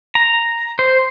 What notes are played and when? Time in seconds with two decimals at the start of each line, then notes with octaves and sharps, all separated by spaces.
0.15 A#5
0.79 C5